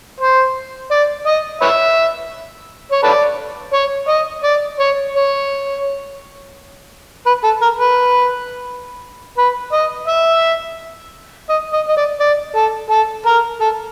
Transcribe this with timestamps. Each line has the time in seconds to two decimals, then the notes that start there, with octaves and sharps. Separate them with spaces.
0.20 C5
0.91 D5
1.27 D#5
1.62 B4 C#5 E5
2.92 C#5
3.03 A4 B4 D5
3.73 C#5
4.09 D#5
4.44 D5
4.80 C#5
5.15 C#5
7.26 B4
7.44 A4
7.62 A#4
7.79 B4
9.38 B4
9.73 D#5
10.08 E5
11.49 D#5
11.73 D#5
11.88 D#5
11.97 D5
12.20 D5
12.56 A4
12.90 A4
13.26 A#4
13.61 A4